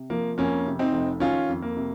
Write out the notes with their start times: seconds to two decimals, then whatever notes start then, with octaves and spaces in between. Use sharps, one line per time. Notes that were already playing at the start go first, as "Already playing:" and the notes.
Already playing: C3
0.10 F3 A#3
0.38 F2 A#3 C#4
0.66 C3
0.79 C4 D#4
0.93 F1
1.20 D#3 C#4 F4
1.49 F2
1.62 A#3
1.77 C3